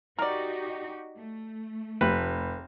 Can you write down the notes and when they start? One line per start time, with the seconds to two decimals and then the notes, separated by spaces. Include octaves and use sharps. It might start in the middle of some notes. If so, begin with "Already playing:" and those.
0.19 D#4 F#4 G4 A#4 D5
1.16 A3
2.01 F1 B4